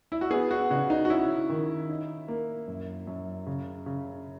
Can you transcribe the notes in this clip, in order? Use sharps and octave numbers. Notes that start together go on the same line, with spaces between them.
E4
F#4
B3 G#4
F#4
C#3 F#4
D#4
F#4
C#4 E4
D#3
D#4
A#3
F#2
F#2
C#3
C#3